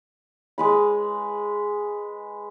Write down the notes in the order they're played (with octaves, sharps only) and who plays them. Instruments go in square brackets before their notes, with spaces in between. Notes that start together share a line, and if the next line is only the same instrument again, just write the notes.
[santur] G#3 B4 B5